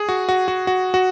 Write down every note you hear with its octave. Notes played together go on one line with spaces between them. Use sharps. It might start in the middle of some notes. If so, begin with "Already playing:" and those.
Already playing: G#4
F#4
F#4
F#4
F#4
F#4